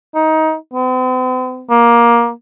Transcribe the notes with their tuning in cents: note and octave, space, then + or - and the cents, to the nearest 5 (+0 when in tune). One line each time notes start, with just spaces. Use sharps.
D#4 +20
C4 -45
A#3 +15